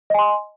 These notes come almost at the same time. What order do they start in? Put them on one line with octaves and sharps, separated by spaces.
D#5 G#5 C6